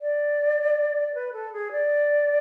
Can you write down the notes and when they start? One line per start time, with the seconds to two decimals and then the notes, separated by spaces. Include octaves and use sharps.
0.01 D5
1.14 B4
1.32 A4
1.52 G#4
1.71 D5